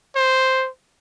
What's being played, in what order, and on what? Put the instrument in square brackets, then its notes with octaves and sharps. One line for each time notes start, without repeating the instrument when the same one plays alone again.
[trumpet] C5